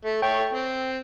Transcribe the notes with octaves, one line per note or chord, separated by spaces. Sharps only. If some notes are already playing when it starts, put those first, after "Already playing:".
A3
A3 C#5 G5
C4